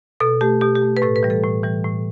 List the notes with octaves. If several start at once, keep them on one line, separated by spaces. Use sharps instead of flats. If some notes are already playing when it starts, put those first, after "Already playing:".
B2 A4
A3 G4
B2 G4
G4
A3
B4
A2 A4
B4
E3 G3
A4
A2
E3 G3
A2